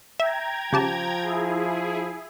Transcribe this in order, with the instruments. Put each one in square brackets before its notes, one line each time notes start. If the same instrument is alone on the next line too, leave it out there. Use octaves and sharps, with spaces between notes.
[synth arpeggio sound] E5 [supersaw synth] G5 A#5 G#6
[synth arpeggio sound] C#3 G4 A5 [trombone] F3
[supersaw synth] E4 G#4